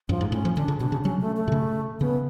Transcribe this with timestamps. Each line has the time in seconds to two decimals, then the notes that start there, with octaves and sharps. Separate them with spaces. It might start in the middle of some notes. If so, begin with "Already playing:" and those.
0.09 F#2 F3
0.21 G#2
0.32 A2 C#4
0.45 F3
0.57 D3 D4
0.68 C#3
0.80 B2 D4
0.92 C#3
1.04 F#3 C#4
1.21 A3
1.37 A3
1.48 B2
1.52 C#3
2.00 C#3 B3